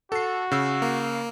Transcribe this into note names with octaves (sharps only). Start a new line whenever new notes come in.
F#4 A4 C7
C#3 E6
A#3